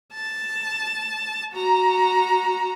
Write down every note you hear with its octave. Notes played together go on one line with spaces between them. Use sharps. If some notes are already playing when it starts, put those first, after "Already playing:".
A5
F#4 A#5